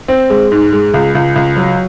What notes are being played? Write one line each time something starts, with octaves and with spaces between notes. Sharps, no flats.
C4
G#3
G#2
G#3
C#2
C#2
C#2
F#3